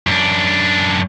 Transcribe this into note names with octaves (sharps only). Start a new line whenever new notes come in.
F#2 D4